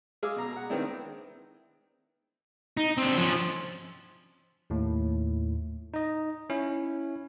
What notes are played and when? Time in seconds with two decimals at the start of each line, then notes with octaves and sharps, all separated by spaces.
0.23 G#3 G#4 F5 D6 E6
0.36 B2 A#5
0.53 F#5 A#5
0.70 D#3 G#3 B3 C4 D4 E4
2.77 D#4
2.97 C4 D4
3.17 F3 C#4
4.70 D#2 A2
5.94 D#4 D#5
6.50 C#4 E4